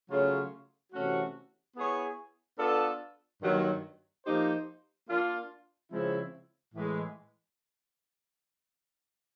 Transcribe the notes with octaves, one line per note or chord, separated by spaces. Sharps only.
C#3 F#3 A3 C#4 F4
C3 E3 A3 C#4 F#4
B3 E4 G#4 C#5
B3 D4 F4 A4
G2 D#3 F#3 A#3
F3 A#3 D#4 G4 C5
A#3 D4 F4
C#3 F3 G#3 C4 E4
A2 E3 G#3